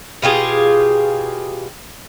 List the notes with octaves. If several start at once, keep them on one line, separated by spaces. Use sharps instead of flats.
B2 F4 G4 G#4